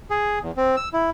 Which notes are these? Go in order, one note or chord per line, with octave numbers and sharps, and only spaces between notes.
G#4
E2
C4
E6
E4